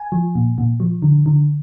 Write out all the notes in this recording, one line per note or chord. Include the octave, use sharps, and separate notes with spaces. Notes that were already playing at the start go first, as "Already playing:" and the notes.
Already playing: G#5
F3
A#2
A#2
F3
D3
D3